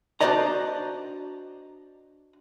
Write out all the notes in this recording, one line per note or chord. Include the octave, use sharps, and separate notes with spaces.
D4 F#4 C5 D5 D#5 A#5